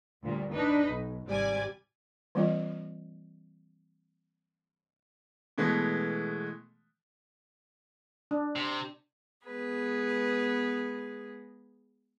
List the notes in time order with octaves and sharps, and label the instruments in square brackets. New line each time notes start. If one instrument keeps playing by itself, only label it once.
[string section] D2 A#2 G3
D4 D#4 B4
B1
G#1 C3 G3 D5 G#5
[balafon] E3 G3 A#3 C4 F4 D#5
[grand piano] B2 E3 G#3 A3 B3
[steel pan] D4
[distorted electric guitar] C3
[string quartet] G#3 B3 G#4 B4